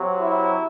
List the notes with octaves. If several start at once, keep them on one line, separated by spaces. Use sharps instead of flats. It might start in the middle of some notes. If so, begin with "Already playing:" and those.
Already playing: C3 F#3
E4